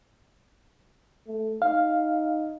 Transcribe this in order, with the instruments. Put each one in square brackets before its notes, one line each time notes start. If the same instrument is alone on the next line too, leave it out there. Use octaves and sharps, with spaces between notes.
[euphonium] A3
[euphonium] D#4 [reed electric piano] F5